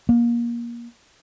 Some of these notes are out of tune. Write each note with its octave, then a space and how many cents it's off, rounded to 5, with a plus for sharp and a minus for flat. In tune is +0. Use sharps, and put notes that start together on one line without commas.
A#3 +25